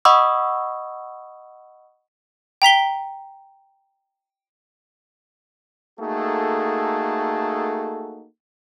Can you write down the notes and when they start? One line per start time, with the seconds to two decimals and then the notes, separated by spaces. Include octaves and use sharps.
0.05 D#5 F#5 B5 C#6 D#6 E6
2.62 G5 A#5 B6 G7
6.00 A3 A#3 D#4 F#4 G#4 A4